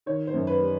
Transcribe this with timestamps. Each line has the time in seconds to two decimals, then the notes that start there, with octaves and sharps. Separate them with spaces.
0.06 D#3 C#5
0.27 C5
0.34 F#2
0.47 B4
0.60 G3